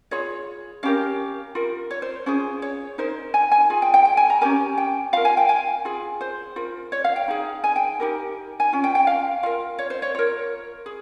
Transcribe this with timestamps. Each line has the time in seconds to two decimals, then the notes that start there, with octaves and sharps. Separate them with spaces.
0.11 F4 G#4 C#5
0.83 C#4 G4 A#4 F5
1.55 F4 A#4
1.91 C#5
2.02 C5
2.26 C#4 F4 G#4 C5
2.62 C#5
2.98 D#4 A#4 C5
3.34 G#5
3.51 G#5
3.70 F4 G#4
3.82 G5
3.94 G5
4.05 G5
4.17 G#5
4.30 A#5
4.41 C#4 G4 A#4 G#5
4.78 G5
5.13 F4 A#4 F5
5.25 G#5
5.37 G5
5.49 G#5
5.85 F4 G#4
6.21 C5
6.56 F4 A#4
6.92 C#5
7.04 F5
7.16 G5
7.28 D#4 G#4
7.64 G#5
7.76 G5
8.00 D#4 G4 A#4
8.60 G#5
8.73 C#4 F4
8.84 G5
8.95 G5
9.07 F5
9.43 F4 A#4 F5
9.79 C#5
9.90 C5
10.02 C#5
10.15 F4 A#4 C#5
10.86 G#4